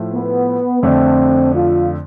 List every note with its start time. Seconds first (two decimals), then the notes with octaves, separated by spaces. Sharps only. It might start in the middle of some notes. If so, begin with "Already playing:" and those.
Already playing: A2 F3 A3
0.14 B3
0.83 F2 D3 A3 C4 D4
1.53 F4